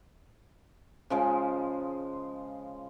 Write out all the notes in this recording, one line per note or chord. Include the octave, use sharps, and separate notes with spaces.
C#3 F3 G#3